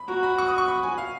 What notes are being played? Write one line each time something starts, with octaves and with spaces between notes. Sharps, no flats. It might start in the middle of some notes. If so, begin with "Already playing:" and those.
Already playing: B5
F#4 A#5
B5
C#6
D#6
C#6
B5
G#5
F5